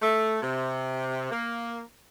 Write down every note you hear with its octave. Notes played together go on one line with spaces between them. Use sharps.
A3
C3
A#3